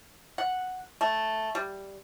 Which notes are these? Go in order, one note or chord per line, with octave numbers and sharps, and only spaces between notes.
F#5
A3
G3